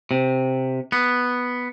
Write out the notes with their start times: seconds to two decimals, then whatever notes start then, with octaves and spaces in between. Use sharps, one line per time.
0.11 C3
0.92 B3